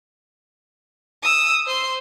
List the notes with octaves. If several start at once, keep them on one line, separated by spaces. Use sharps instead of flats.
D#6 E6
C5 C6